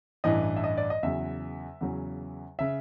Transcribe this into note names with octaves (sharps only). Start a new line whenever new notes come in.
A1 G2 E3 D#5
E5
D#5
D5
D#5
E2 C#3 F#3 E5
E2 C#3 F#3
C#3 E5